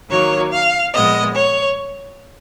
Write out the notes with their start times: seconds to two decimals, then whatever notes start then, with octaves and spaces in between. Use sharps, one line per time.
0.10 D#3 F#3 A#3 C#5
0.52 F5
0.93 A#2 F3 G#3 B3 D#5
1.35 C#5